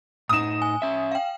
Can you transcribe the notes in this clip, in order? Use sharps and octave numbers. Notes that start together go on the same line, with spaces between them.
A2 D#4 D#6 E7
G#5
C#4 E5
F5 G5